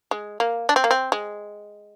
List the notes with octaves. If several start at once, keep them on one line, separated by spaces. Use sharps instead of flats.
G#3
A#3
D4
C4
A#3
C4
G#3